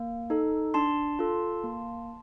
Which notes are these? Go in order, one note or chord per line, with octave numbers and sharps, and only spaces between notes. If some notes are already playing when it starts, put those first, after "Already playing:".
Already playing: A#3
D#4 A4
D4 A5 C6
F4 A4
A#3